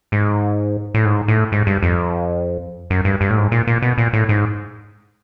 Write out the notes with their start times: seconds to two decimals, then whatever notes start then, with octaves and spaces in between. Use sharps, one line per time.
0.12 G#2
0.94 A2
1.05 G#2
1.28 A2
1.52 G#2
1.67 G2
1.83 F2
2.90 F#2
3.05 G2
3.21 G2
3.30 A2
3.37 G#2
3.52 A#2
3.67 A#2
3.82 B2
3.98 A#2
4.13 A2
4.29 G#2